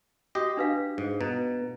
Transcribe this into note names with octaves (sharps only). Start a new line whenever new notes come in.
F#4 G4 D#5
D4 B4 F5
G#2
B2 A#5